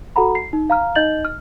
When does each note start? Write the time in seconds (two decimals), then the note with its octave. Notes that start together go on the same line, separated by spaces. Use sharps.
0.16 F#4 A4 F#5 A#5 B5
0.35 C7
0.53 D#4
0.70 F5 A#5 F6
0.95 D#4 D#5 G6 A6 F#7
1.25 F6